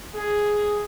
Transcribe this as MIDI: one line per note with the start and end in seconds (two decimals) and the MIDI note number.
0.15 0.84 68